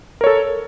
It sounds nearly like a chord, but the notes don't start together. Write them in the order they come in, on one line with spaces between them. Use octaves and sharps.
A#4 C#5 A4